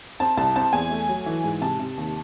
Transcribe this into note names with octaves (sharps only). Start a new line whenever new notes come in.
C4 A5
C2 A5
C4 A5
E2 G#5
A3
F#3
E3
G#2
C3 A5
C3
D#2